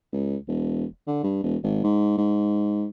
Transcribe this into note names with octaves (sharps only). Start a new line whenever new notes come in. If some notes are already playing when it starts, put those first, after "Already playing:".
C#2
E1
D3
G2
E1
G#1
G#2
G#2